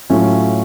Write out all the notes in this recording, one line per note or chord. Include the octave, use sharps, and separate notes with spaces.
A2 F#3 A3 C#4 F4